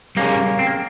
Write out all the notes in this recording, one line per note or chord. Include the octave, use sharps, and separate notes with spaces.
G3 A#3 C#4 G#4
C4
A#3